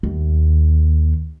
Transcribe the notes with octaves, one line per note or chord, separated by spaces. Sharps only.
D#2